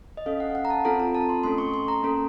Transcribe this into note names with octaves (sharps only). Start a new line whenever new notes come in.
D#5
C#4 A4 F5
F#5
F5
F#5
A#5
A5
C4 F4 A4 A#5
A#5
A5
C6
A3 C#4 A4 C6
C#6
C6
A#5
A#3 C#4 A4